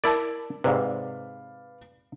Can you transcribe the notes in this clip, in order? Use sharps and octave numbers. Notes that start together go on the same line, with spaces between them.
E4 A#4 D5 A5
G#2 C3 B4 D5 F5